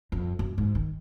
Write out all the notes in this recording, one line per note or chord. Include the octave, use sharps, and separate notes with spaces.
F2
F#2
G#2
D#3